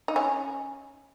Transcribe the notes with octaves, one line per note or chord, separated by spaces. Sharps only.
D#4
C#4